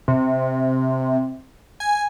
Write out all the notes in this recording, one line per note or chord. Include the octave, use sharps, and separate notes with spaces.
C3
G#5